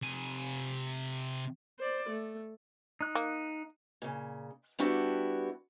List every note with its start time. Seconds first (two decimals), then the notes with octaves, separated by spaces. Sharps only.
0.02 C3 G#5
1.80 C5 D5
2.09 A3
3.01 D#4 F#6
3.15 A#3
4.02 A#2 C#3
4.79 G3 B3 D4 E4 F#4 G4